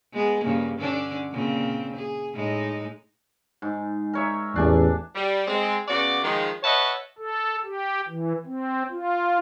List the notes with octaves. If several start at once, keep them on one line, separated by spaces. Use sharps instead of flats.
G#3 B3 G#4
G2 C#3 A#3
D3 C#4 D4
A#2 C#3 C4
G#4
A2 G#3 D#4
G#2
A#4 C#5 E5
A1 E2 D4 G#5 A5
G3
G#3 C4
C#3 B3 F#4 D5
D#3 F3 G#3
B4 C#5 D#5 E5 F#5 A5
A4
G4
E3
C4
F4